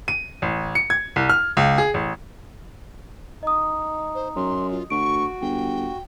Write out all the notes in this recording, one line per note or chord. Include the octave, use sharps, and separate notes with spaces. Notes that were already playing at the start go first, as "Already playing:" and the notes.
D#7
A1
C#7
G#6
C2
F6
C#2
G#4
A1
D#4 D#5 D#6
C5
F#2 C6
F4
D2 F#4 C#6 D7
G1 G5